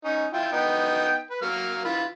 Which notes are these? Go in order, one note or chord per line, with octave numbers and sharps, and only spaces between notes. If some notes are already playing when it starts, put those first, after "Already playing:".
C#4 D#4
E4 F4 G5
B3 D#4 G5
B4
F#3 A#3 F6
E3 F4 B5